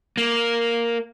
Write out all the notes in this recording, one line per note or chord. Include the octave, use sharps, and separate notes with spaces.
A#3